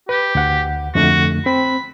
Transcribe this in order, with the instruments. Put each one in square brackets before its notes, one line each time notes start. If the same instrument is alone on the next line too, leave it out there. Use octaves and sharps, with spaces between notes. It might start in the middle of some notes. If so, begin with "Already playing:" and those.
[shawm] G4 [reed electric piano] B4
[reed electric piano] D2 F#5
[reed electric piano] F2 D3 A3 [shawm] F#4
[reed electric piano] C4 [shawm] B5